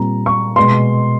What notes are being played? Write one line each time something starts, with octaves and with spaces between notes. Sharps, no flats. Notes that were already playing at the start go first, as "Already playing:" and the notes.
Already playing: A#2 G3 C4 A#5
C#6
B2 G#3 B3 C6